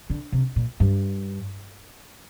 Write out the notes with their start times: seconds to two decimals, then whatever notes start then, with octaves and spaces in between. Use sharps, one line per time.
0.10 D3
0.32 C3
0.56 A#2
0.80 G2